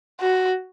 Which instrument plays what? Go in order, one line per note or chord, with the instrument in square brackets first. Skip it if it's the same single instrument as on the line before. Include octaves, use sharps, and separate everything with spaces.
[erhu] F#4